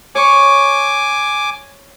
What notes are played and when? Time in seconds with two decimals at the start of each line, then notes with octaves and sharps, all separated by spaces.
0.15 C#5 G#5 C#6 D6